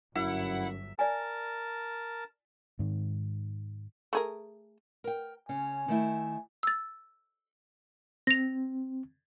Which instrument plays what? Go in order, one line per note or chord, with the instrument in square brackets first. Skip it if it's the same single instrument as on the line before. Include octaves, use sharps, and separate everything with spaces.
[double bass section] G1 F#3 [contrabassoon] F#2 [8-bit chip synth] E4 F#5 [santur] E5
[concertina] A#4 A5 [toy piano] D5 G#5
[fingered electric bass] G#2 D#3
[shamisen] A3 G#4 A#4
[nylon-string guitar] A#4 G5
[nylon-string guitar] C#3 C#4 [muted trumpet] G#5
[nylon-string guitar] D#3 A3 E4
[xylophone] E6 A6
[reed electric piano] C4 [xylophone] A#6 F7